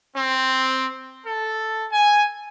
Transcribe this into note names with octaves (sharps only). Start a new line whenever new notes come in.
C4
A4
G#5